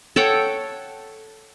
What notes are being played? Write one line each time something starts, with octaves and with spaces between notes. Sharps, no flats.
A4 C#5 F#5 G5